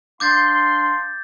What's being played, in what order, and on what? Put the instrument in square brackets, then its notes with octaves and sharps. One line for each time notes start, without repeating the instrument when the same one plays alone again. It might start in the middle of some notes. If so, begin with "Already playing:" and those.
[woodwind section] D4 F5 C6 [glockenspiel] D6 G6 A6